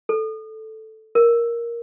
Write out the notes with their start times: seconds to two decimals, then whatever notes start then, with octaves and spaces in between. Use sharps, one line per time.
0.09 A4
1.15 A#4